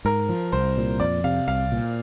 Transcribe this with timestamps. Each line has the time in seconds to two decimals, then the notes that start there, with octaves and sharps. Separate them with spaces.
0.05 G#2 A#4
0.29 F3
0.52 C2 C5
0.77 A#2
1.00 F2 D5
1.24 C3 F5
1.48 C2 F5
1.72 A#2